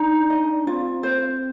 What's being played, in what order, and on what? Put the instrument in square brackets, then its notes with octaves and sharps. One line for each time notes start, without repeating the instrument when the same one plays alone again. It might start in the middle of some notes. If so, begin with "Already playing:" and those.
Already playing: [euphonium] D4 [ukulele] D#4
[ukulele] D#5
[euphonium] C4 [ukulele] F4
[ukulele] C5